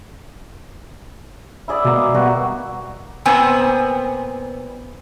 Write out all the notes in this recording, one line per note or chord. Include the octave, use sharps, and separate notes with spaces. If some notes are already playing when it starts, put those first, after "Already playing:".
E4 G#4 D5
B2 G#3 A#3
B2 G3 F#4
A#2 B3 C4 G#5